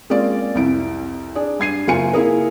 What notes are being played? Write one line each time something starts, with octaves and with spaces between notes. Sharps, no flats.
G#3 A#3 C4 C#4 F4 D5
C2 F2 E4 D7
D4 G#4
G2 G#6 C7 D#7
F#1 A#3 F4 F#4 G#5 C#7
A#3 E4 G#4 A#4